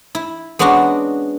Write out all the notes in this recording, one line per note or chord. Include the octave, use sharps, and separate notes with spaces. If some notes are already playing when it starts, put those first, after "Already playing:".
E4
G#3 B3 C#4 D4 F#4